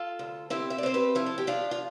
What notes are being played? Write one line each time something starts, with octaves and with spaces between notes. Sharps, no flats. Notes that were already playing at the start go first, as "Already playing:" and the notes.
Already playing: F4 A4
D2
C4 E4 G4
E5
D5
C4 C5
G4 B4
F3 E4
A4
G4
F3 D4 F4
F4